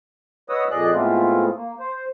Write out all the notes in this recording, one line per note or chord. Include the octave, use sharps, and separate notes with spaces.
B4 C#5 D#5 F#5 D#6 E6
F2 A#2 G#4 D5 D#5 F#6
A2 G#3 A3 B3 C4 F4
A#3
C5